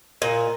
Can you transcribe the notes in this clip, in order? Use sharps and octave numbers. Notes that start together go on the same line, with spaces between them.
A#2